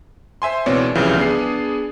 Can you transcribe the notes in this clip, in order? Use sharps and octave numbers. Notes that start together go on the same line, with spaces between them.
C5 E5 G#5 C6
C#2 B2 E3 C4 C#5 D5
C2 C#3 E3 F3 G3
B3 D4 G#4 C7